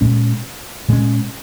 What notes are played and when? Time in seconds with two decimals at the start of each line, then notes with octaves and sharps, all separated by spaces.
0.01 A#2 G#3 C#4
0.88 A#2 G#3 C#4